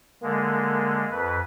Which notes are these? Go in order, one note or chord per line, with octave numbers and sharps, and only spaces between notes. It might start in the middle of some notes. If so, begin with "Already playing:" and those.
D3 G#3 A#3
F2 B4